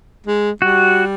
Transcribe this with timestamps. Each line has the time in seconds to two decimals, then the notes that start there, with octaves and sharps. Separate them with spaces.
0.26 G#3
0.62 G3 F#4